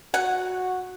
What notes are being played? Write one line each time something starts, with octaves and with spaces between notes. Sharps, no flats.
F#4 F#5